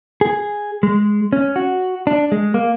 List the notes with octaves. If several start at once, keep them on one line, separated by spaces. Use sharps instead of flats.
G#4
G#3
C#4
F#4
D4
G#3
A#3